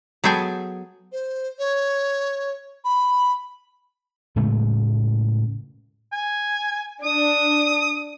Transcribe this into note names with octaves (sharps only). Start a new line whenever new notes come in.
F#3 B3 G#4 A4 G5 G#5
C5
C#5
B5
A2 C#3 G#3 A3
G#5
D4 D#6